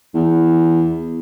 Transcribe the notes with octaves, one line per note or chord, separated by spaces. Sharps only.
E2